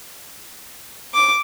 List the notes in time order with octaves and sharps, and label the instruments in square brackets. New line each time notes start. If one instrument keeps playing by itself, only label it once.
[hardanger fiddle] D6